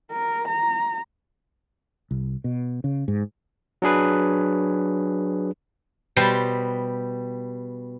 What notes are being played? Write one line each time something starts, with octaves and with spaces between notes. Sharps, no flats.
A#4
A#5
C2
B2
C#3
G#2
F#3 D4 G#4 B4
B2 G3 B4 C5 A5 C6